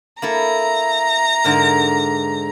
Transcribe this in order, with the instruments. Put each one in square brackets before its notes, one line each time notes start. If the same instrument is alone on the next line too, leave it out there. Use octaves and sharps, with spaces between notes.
[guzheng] A#3 E4 A4 [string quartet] A#5
[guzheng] G#2 D3 A#4